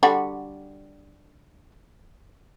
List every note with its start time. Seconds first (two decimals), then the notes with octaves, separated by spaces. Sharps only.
0.03 D3 G3 F#4